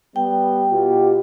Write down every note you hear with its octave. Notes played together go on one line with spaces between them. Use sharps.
G3 B3 G5
B2 F4 G4